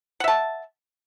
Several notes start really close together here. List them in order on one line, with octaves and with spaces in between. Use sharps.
F#5 E5 A5